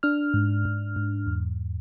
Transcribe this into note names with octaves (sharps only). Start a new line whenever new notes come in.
D4 F6
G#2
G#2
G#2
E2